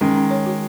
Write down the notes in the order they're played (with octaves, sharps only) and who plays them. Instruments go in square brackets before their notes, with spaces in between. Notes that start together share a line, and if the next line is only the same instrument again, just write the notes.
[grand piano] D#3 G#3 [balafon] C#4
[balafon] C#4
C#5
F#4